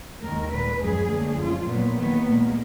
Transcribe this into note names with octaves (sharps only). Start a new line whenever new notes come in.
D#2 D#3 G#3 A#4
A#2 G#3 B4
F#2 F3 G#3 G#4
D2 D3 F#3 A#3
F#2 F3 G#3 F4
A#2 F#3 A#3 B3
D#2 D#3 F#3 A#3 B3
A#2 G#3 A#3